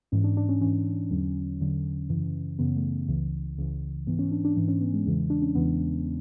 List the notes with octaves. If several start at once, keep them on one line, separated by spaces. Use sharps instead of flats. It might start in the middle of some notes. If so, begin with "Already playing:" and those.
G#2 E3 C#4
D4
D4
C#4
G#2 E3 C#4
E2 D3 F#3
E2 D3 F#3
F#2 C#3 E3
F#2 C#3 E3 B3
A3
C#2 C#3 E3
C#2 C#3 E3
G#2 E3 B3
C#4
D4
D4
G#2 E3 D4
C#4
B3
G#3
E2 C#3 E3 G#3
D4
C#4
E2 C#3 E3 B3